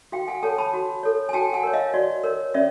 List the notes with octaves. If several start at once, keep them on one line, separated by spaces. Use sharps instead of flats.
F#4 F5 G5
F#5 G#5
A4 C#5 G5 A5
A5 B5
F#4
A4 C#5
G#5
F#4 G5 A5
F#5 G#5
A#4 C#5
D#5 F5
F#4 D5
A#4 C#5
C#4 D5 E5